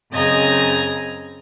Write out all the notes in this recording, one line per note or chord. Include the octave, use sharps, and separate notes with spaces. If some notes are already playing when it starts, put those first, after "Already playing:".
F#2 C#3 C4 D#5 A#5 G#6